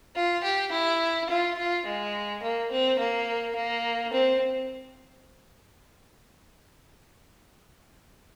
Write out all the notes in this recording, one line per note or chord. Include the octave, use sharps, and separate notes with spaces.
F4
G4
E4
F4
F4
G#3
A#3
C4
A#3
A#3
C4